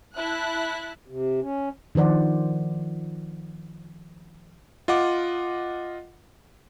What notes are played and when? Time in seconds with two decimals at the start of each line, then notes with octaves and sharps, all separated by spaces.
0.15 E4 E5 A5 F#6
1.08 C3
1.41 C#4
1.95 D#3 F3 C5 D5 F#5
4.88 F4 D#5 F#5 D6